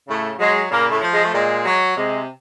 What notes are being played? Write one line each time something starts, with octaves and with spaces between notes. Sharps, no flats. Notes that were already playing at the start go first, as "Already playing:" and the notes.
A2 C#3 A3
F#3 G#3
A#2 C#3 A#3
A2 A3
F3
G#3
A3
A#2 G#3
F#3
C3 G#3